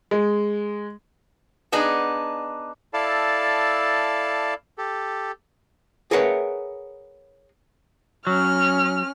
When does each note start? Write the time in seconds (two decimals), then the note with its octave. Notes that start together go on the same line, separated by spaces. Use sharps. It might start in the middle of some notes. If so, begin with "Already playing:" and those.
0.11 G#3
1.72 B3 D4 D#4 G#4
2.94 E4 A4 D5 F5 A5
4.78 G4 A4
6.11 G#4 A#4 B4 C#5 E5 F#5
8.27 F#3 C#4 F6